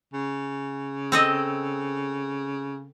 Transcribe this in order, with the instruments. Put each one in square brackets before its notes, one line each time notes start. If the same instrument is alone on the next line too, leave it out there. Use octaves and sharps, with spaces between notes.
[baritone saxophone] C#3
[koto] C4 A4 D#5